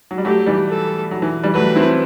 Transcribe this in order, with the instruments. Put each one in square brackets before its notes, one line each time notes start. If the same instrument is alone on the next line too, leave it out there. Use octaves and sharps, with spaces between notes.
[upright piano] F#3
G3
[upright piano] F#3 A3 [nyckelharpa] G4
[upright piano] E3 G3
[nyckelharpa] A4
[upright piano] F#3
E3
E3 G3
[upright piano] F#3 A3 [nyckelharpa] B4
[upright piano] C4 E4